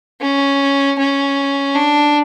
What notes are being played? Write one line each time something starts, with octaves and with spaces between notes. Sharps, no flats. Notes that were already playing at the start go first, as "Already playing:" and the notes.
C#4
C#4
D4